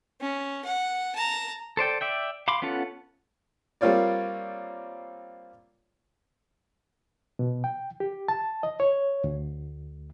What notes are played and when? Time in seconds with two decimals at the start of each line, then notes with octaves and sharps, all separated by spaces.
0.21 C#4
0.65 F#5
1.15 A5 A#5
1.77 A4 C5 D5 G5
2.01 D5 E5 G5
2.48 F5 B5 C6 D6
2.62 B3 C#4 F4 A4 F#5
3.81 G3 A#3 C4 F4 C#5 D5
7.39 B2
7.64 G5
8.00 G4
8.28 A5
8.63 D#5
8.80 C#5
9.24 D2